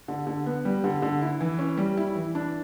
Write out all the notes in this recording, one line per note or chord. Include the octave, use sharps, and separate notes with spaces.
D3
D3
B3
G3
D3
D3
E4
E3
C#4
G3
E4
E3
D4